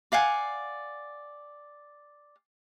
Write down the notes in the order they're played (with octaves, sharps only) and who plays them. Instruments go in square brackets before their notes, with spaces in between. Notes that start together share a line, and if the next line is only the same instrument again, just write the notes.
[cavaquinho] D5 F5 F#5 G#5